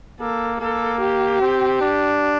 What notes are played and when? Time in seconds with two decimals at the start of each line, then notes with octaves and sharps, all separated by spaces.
0.20 A#3 A4
0.60 A#3 A4
1.01 G4
1.41 C4
1.81 D4